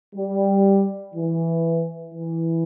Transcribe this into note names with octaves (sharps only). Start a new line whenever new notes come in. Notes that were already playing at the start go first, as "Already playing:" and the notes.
G3
E3
E3